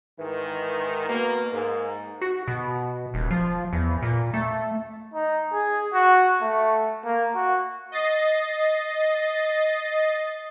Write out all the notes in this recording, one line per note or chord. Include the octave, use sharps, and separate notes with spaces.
G#2 D#3 E3
B2 A#3
G#2 A#3
F#4
B2
D#1
F3
E2
A#2
A3
D#4
G#4
F#4
A3
A#3
F#4
D#5 A6 C7